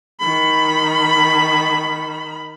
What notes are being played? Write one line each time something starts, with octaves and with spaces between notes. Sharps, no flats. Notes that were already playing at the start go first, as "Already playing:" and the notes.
D#3 B5